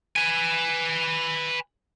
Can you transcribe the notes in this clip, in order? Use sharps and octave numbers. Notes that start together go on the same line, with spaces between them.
B4 G#5